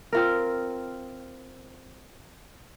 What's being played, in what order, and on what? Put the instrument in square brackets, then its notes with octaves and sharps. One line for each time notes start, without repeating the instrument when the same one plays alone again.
[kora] C4 F4 A#4